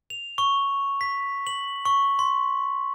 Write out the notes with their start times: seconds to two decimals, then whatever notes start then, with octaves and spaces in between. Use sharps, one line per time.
0.10 F7
0.38 C#6
1.01 B6
1.47 F#7
1.85 C#6
2.19 C6